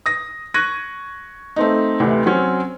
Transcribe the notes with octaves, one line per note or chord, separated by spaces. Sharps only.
D#6 A#6
C#6 F#6 G#6 A#6 D#7
A3 C4 D#4
A1 D2 C3 E3
F#3 C4 C#4